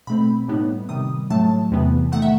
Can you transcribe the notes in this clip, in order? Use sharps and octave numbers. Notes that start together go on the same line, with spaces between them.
B2 A3 C4 B5
A2 G3 B3 D#4
C3 D#3 G3 D#6
A2 F#3 A3 A5
E2 C3 E3 B3
D#3 A3 F#5
E5